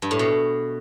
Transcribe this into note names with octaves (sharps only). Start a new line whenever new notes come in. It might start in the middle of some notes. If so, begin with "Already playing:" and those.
G2
A2
B2